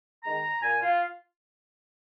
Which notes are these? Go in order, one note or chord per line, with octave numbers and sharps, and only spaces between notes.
D#3 G#3 D#4 A#5
A#2 G#5
F4